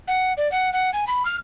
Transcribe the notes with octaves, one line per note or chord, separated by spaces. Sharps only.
F#5
D5
F#5
F#5
G#5
B5
F6